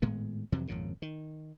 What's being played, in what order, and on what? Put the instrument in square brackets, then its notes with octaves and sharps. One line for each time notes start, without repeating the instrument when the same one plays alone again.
[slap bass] G#1 A2 G#3 B3
F2 C3 E3 F#3
G#1 F2 A#2 C#3
D#3